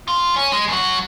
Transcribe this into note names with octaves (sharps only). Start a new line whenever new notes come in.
F4
C#4
G#3
F#2 F#4